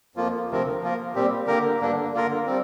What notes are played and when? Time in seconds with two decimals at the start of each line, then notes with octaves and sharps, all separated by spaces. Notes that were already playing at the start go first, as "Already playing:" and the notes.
0.16 F2 F3 A#3 F4
0.50 D2 C3 F3 C4 A#4
0.82 F3 A#3 F4 A#4
1.15 A#2 G3 C4 G4
1.47 D3 A#3 G4 A#4
1.80 G2 D3 A#3 D4
2.13 D3 A#3 F4 A#4
2.46 G3 C4